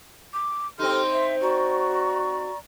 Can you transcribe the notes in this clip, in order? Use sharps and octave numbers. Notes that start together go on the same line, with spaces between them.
D6
C4 D#4 G4 A4 C6 F6
C5 E5
F#4 D5 A#5 C#6